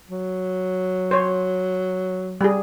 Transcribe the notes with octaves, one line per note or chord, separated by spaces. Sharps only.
F#3
C5 C#5
G3 G#4